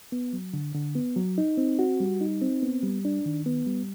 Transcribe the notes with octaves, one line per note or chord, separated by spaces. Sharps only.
B3
F#3
D3
D3
B3
F#3
D#4
C4
F#4
G3
D#4
C4
B3
G3
D4
D#3
B3
G3